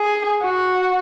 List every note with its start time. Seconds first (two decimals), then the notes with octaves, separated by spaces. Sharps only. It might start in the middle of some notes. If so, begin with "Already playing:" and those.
Already playing: G#4
0.41 F#4